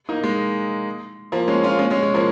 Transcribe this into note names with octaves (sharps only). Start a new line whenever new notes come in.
A#3 D#4
G#3
F3 A#3
G#3 C#4
C#4 F4
G#3 C#4
G#3 C#4
G#3
F3 A#3